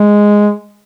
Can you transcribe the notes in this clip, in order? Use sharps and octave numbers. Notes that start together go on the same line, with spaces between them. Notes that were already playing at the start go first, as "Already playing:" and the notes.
Already playing: G#3